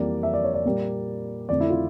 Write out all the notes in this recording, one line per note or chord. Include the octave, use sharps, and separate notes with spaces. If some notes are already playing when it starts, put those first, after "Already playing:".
Already playing: F2 E3 G3 A#3 D5
E5
D5
C#5
D5
A#2 G3 A#3
F2 D3 A3 D5
E4
F4